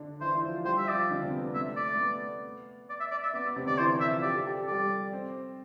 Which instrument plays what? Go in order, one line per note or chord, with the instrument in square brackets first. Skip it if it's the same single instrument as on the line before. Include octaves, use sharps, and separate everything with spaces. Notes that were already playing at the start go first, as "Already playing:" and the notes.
Already playing: [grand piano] D3 D4
[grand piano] E3 E4 [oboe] C5
[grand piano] E4
F3 F4
[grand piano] G3 G4 [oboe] C5
[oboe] E5
[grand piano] F3 F4 [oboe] D5
[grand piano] D3 D4
C3 C4
B3
B3
[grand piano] A3 [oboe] E5
[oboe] D5
[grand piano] A3
B3
[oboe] D5
E5
D5
E5
[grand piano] B3 [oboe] D5
[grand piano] B3
C3 C4
[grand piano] D3 D4 [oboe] D5
[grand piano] E3 E4 [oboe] C5
[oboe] E5
[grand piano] F3 F4
[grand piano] G4 [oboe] D5
[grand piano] A4
G4
A4
[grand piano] G3 G4 [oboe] D5
[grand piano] C4 C5